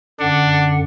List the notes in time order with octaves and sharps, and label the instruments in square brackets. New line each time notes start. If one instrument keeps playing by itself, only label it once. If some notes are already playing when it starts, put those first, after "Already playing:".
[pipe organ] F#2 D3 F#5 [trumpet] D4